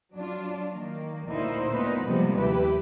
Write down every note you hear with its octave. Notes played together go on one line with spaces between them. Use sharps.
F#3 D4 F4
D#3 A#3
D2 A#2 A#3 D#4 E4 C5
A#2 B3 D#4 B4
C3 F3 G3 G#3 A#3 B3
D#2 E4 G4 B4